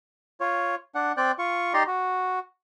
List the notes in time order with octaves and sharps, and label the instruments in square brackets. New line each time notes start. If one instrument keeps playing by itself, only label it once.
[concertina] F4 C#5
D4 F#5
C4 D5 G5 F#6
F4 C#6
D#4 G4 D5 A#5 C6
F#4